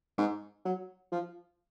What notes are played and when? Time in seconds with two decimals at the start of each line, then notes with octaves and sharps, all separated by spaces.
0.18 G#2
0.65 F#3
1.12 F3